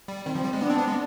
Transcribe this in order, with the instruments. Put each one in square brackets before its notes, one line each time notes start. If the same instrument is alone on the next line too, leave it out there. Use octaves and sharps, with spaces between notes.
[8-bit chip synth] G3
[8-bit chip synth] D#3 [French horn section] C4
[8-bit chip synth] F3
G3
G#3
[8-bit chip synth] B3 [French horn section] D4
[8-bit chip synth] C4
B3
G#3